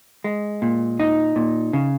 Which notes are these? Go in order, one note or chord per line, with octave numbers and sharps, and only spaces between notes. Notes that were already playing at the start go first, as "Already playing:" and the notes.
G#3
A#2
D#4
A#2
C#3